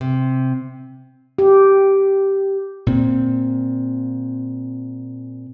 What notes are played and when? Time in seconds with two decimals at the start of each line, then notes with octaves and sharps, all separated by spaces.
0.01 C3
1.38 G4
2.87 A#2 C4